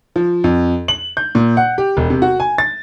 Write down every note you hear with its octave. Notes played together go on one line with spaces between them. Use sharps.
F3
F2
F#7
G6
A#2
F#5
G4
E1
C3
F#4
G#5
A6